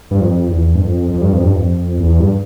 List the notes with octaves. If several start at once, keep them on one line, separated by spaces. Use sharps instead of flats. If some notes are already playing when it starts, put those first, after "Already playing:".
G2
F2
E2
G2
F2
F2
G2
F2
G2
F2
E2
G2